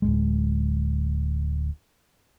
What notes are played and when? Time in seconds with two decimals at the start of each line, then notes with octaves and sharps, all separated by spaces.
0.02 D1 D#2 G#3